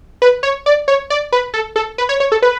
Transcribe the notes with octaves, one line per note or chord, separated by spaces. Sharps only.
B4
C#5
D5
C#5
D5
B4
A4
A4
B4
C#5
C#5
A4
B4